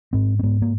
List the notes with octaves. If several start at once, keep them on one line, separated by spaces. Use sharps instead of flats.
G#2 C4
C4
G#2 B3
A#3